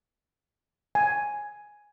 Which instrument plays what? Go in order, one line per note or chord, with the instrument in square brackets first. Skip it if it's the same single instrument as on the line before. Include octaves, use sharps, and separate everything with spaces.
[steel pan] G#5